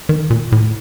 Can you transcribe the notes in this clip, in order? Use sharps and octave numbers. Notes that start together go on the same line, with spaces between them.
D#3
A#2
A2